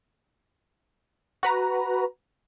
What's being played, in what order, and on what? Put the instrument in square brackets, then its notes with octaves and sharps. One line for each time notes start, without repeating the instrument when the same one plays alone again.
[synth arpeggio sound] F#4 B4 A#5